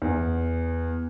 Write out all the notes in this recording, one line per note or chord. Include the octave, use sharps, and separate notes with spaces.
E2